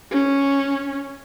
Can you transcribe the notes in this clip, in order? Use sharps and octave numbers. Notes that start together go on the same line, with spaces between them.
C#4